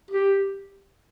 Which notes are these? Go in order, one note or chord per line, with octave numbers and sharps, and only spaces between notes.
G4